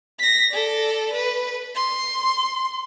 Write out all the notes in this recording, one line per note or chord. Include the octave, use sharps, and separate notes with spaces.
A#6 B6
A4 D5
B4
C6